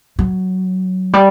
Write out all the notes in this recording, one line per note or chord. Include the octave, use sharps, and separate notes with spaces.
F#3
G3